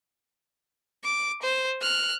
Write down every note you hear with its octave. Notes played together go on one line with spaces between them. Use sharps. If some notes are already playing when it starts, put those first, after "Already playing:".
D6
C5
F6 F#6